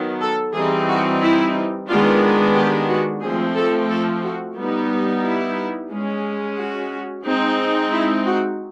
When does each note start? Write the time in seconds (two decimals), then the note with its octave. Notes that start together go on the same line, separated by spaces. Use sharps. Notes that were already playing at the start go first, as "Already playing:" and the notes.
Already playing: D#3 F#3 B3
0.21 A4
0.53 E3 G3 C4 D#4 G#4
0.88 F#4
1.22 E4
1.88 D#3 G#3 B3 D4 F4
2.55 G4
2.88 F#4
3.22 F3 A3 C4 G#4
3.55 A4
3.89 A4
4.23 F#4
4.56 G3 B3 D#4
5.23 E4
5.91 G#3 C#4
6.57 F#4
7.25 G#3 C4 D#4
7.92 E4
8.25 F#4